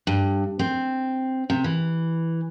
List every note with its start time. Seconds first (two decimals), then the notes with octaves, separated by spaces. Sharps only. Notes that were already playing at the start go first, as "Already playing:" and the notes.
0.07 G2
0.59 C4
1.50 C3
1.64 E3